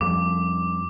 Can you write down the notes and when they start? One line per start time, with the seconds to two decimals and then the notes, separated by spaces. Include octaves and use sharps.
0.01 F2 F3 G3 D6